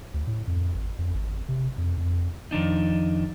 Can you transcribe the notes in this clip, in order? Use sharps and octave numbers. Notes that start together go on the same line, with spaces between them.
D2
A2
F2
G#1
F2
G#1
C3
F2
F2
F2 D#3 D4 D#4